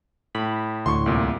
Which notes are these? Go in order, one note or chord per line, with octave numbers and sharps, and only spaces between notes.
A2 B5
D2 A2 C6 C#6
C2 A#2